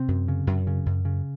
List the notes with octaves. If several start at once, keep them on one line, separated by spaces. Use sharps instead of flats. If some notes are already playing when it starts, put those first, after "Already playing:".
Already playing: C3 C4
F#2
C#3
F#2
C#3
F#2
C#3